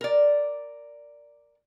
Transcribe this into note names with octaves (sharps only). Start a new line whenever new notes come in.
A#4 D5